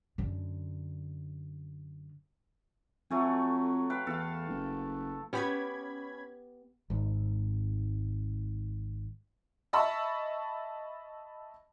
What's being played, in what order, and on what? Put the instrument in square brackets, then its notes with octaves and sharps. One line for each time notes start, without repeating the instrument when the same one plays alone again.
[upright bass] F#2 D3
[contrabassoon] F2 [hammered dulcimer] F#3 A3 G#5
[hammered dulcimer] B4 F5 G5
[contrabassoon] E2 [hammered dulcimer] A4 F5
[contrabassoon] F#1
[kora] B3 G4 [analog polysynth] C#4 B5 G#6
[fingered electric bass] G#1 G#2
[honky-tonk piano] D#5 E5 A5 B5 C#6 E6